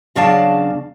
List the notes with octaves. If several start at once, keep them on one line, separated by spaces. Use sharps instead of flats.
E2 C#3 F#3 D4 F5 A5